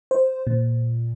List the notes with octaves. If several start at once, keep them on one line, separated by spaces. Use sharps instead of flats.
C5
A#2